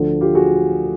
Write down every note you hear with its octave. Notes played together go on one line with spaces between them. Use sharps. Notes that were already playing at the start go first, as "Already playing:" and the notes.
Already playing: D2 D3 F3
F4 G4
F#4 G#4